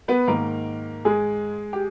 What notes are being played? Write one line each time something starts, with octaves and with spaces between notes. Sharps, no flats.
B3 B4
G#2 D#3 A#3 A#4
G#3 G#4
G4